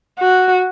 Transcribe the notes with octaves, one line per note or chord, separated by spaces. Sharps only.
F#4